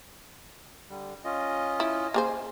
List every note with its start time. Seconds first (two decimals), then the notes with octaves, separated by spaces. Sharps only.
0.90 D3 G3
1.24 C#4 F4 D#5
1.80 E4
2.14 A#3 G#4 C5